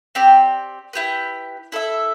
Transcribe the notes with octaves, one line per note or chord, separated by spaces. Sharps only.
C4 G4 D5
E4 G4 B4
E4 A4 E5